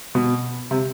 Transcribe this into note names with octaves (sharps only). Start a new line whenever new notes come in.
B2
C3